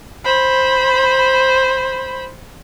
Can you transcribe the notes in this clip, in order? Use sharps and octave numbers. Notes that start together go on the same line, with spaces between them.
C5 B5